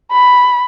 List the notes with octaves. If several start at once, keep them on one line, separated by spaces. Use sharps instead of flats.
B5